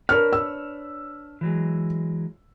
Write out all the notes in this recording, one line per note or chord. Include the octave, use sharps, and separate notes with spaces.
D4 A#4 B4 C#5 F6
E6
E3 F#3 G#3